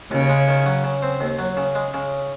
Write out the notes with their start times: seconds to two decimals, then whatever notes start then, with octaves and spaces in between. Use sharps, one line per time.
0.11 D#2 C#3
0.29 G#3
0.48 D#3
0.66 F#3
0.84 C#3
1.02 C4
1.21 D#2
1.39 F#3
1.57 C#3
1.75 G#3
1.94 C#3